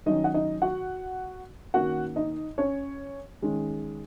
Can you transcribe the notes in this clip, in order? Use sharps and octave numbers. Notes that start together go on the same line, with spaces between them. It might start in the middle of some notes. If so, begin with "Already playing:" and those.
D#3 F#3 C#4 D#4 D#5
F#5
D#4 D#5
F#4 F#5
D#3 A#3 C#4 F#4 F#5
D#4 D#5
C#4 C#5
D#3 G#3 C#4